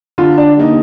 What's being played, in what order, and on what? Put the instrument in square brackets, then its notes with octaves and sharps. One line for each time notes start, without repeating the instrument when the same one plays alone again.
[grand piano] D3 [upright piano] F4
[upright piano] D4
[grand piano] G3 A#3 D#4